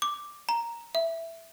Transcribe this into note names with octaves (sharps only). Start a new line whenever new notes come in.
D6
A#5
E5